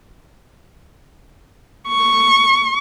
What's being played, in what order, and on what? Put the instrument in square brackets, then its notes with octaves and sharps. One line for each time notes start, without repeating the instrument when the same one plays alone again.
[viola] C#6